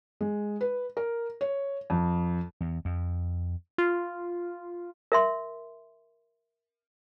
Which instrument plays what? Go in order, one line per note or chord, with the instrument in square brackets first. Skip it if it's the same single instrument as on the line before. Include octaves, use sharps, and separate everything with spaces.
[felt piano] G#3
B4
A#4
C#5
F2
[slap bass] E2
F2
[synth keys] F4
[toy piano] A#4 E5 C6